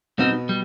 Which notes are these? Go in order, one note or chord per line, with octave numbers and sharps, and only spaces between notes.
B2 G3 B3 C4 D#4
G3